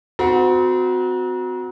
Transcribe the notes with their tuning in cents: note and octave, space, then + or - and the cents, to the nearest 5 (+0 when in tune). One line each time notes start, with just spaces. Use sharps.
C4 -35 F#4 -15 A#5 +35